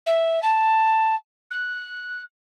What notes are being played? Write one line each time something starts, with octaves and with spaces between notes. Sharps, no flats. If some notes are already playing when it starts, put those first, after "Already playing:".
E5
A5
F#6